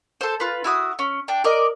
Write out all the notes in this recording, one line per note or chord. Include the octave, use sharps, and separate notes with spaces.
A4 C5
F4 B4
E4 F#4 D#6
C#4
D4 G5
A#4 D5 D#5